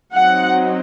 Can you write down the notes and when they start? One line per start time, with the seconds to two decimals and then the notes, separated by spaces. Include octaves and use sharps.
0.14 F#3 C4 D#4 F#5